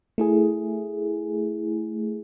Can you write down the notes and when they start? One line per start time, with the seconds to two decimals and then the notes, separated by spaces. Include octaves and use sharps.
0.18 A3 E4 G#4